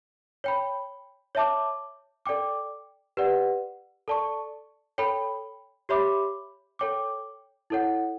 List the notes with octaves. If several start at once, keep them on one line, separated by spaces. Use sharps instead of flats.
C#5 G5 B5
C#5 E5 A5 D6
A4 D5 G5 D6
G4 B4 D5 F#5
A4 D5 A5 C#6
A4 C#5 G5 B5
G4 C#5 E5 B5 D6
A4 C#5 G5 D6
E4 A4 C#5 F#5